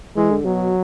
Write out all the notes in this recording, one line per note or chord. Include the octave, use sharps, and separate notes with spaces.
E3 G#3
D3
B2 F#3